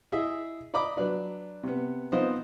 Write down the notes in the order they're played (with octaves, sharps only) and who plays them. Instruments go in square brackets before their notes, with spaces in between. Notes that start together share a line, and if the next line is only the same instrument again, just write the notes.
[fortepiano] E4 G#4 D#5 E5
D5 D#5 A#5 B5 D6
F#3 D4 B4 D5
C3 B3
F3 B3 C4 D#4 C5 D#5